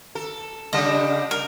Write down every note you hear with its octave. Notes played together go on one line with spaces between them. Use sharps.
A4
C#3 G3 D4 D#5
A#4